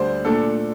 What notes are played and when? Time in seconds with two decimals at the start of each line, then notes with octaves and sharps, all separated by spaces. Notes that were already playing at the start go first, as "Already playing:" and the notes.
Already playing: D2 D3 G3 D4 C5
0.25 A#2 A3 D4 A4